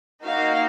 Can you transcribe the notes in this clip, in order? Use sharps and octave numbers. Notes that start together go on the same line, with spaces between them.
A#3 D#4 F#4 F5